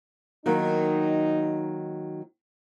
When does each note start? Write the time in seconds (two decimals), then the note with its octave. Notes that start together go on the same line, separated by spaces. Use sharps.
0.46 D#3 F#3 A#3 D#4